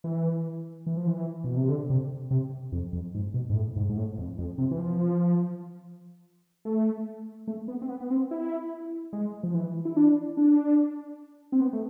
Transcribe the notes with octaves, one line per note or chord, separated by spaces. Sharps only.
E3
E3
F3
E3
B2
C3
D3
C3
C3
F2
F2
G#2
B2
G#2
A2
G#2
G#2
A2
F2
F2
C3
E3
F3
A3
A3
B3
C4
B3
B3
C4
E4
G#3
F3
E3
E4
D4
D4
C4
B3
A3